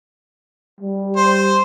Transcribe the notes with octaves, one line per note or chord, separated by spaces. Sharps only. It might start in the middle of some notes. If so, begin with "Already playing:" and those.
G3
C5